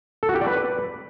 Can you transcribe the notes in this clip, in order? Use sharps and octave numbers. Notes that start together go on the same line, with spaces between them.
A4
F#4
G4
D5
B4